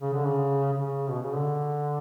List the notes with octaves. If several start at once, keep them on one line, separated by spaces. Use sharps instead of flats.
C#3
D3
C#3
C#3
B2
C#3
D3